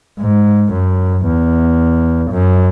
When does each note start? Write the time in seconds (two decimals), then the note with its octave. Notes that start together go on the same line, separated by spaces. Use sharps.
0.20 G#2
0.73 F#2
1.25 E2
2.31 F#2